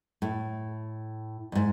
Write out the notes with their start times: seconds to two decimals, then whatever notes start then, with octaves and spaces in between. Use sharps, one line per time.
0.22 A2
1.52 F2 G#2